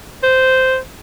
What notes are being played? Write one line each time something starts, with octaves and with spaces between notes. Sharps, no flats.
C5